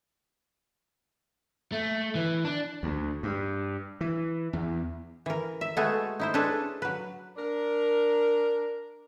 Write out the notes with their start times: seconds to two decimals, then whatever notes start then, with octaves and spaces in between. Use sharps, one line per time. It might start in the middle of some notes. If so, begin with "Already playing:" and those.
1.72 A3
2.15 E3
2.45 D4
2.83 D2
3.23 G2
4.01 E3
4.53 E2
5.26 E3 A#4
5.61 E5
5.77 G#3 A3 B3 F#4 G#4 A4
6.20 D#4 E4 C5
6.34 D4 G#4 A4 B4 C#5
6.82 F#3 B4
7.37 D4 A#4